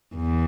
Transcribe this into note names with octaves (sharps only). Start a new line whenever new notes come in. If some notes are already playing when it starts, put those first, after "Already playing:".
E2